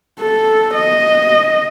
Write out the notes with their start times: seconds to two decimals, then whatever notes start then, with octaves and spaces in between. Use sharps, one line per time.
0.20 A4
0.75 D#5